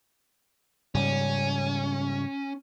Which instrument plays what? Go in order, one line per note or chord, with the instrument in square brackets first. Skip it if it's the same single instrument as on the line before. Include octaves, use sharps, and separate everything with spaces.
[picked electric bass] G#2 C#3 G3 [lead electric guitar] C#4